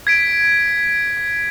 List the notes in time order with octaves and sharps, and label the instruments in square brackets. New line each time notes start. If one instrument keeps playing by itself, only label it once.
[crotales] G#6 B6 D7